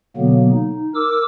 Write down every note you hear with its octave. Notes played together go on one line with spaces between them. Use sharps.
B2 D3 F#3 A#3 B3
D#4
A#4 D6 E6